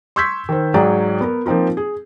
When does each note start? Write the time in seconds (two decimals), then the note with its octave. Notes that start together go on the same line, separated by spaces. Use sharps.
0.16 C6 C#6 E6 G6 G#6 B6
0.49 D#3 C5
0.74 G#2 F#3 G#4 D5 G5 A#5
1.21 B3 A#4
1.46 F3 A#3 C4 D#4 F4
1.77 G#4